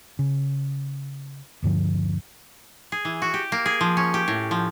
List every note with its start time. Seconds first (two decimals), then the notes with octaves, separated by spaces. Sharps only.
0.19 C#3
1.62 D#1 G2 D3 F3
2.92 G#4
3.05 E3
3.22 F#4
3.34 G4
3.52 A#3
3.66 G#4
3.81 F3
3.97 C#4
4.14 G4
4.28 A2
4.51 F3